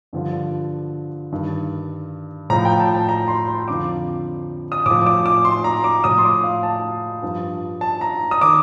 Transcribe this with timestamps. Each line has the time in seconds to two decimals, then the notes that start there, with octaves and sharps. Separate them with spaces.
0.13 G2 D3 F3
1.32 G2 D#3
2.50 A2 F3 A#5
2.65 G5
2.80 A5
2.95 A5
3.09 A#5
3.28 C6
3.48 C6
3.68 F2 D3 F3 D6
4.72 D#6
4.86 A2 D6
4.90 F3
5.06 D6
5.26 D6
5.45 C6
5.64 A#5
5.84 D6
6.04 A2 F3 D#6
6.18 C6
6.25 D6
6.44 F5
6.63 A5
7.22 G2 F3
7.81 A5
8.01 A#5
8.31 D#6
8.41 D#3 D6